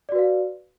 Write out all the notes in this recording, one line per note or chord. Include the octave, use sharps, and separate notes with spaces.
F#4 B4 D5 F5